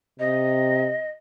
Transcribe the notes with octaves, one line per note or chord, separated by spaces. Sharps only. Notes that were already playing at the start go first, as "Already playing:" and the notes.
C3 D#5